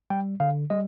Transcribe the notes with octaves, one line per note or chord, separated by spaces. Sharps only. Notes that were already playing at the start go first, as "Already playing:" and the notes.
G3 G5
D3 F5
G3 D#5